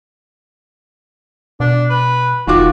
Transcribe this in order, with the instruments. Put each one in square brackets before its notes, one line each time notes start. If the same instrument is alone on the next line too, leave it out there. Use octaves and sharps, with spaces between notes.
[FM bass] B2 [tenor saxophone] D4
[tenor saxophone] B4
[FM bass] F1 [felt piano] D#3 F4 D6 [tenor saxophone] F#4